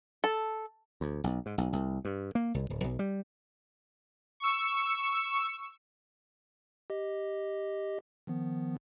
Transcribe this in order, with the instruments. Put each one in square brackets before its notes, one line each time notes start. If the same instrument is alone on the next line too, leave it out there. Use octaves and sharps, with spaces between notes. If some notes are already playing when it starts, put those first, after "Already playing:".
[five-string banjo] A4
[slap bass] D2
B1
G#2
B1
C2
G2
A#3
C2
D1
B1
G3
[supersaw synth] C#6 E6
[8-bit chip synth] G4 D#5
D#3 F3 B3